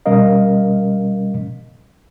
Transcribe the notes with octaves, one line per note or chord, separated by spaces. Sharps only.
B2 G3 C#4 A#4 D#5 F5